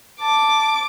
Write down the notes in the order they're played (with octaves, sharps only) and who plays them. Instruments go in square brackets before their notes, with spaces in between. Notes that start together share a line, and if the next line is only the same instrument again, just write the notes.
[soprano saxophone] A5 [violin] D6